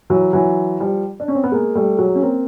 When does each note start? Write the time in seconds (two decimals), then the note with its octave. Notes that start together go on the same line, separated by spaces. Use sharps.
0.10 E3 F#3
0.33 E3 F#3
0.80 F3 G3
1.20 D4
1.28 C#4
1.35 C4
1.44 B3
1.52 G#3 A#3
1.75 G3 A3
1.98 F#3 G#3
2.15 C#4
2.22 A#3 C4